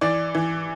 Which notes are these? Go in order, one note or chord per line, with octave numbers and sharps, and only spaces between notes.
E3 D5
E3